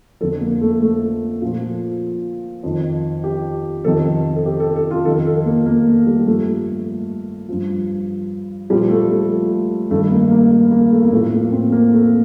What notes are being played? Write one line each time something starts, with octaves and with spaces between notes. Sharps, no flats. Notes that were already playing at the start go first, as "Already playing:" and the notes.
F2 D3 F3 A4
A#3
A3
A3
A#2 F3
F2 D#3
G4
F2 C3 D#3 A4
A4
G4
A4
A4
F4
F2 D#3 A4
A4
A#3
A#3
A3
G3
G2 F3 A3
G2 F3
A#2 F3 G3
A3
A3
G2 D#3 A3
A#3
A#3
A#3
A3
A#3
A2 F3 A3
A#3
C4
A#3
A3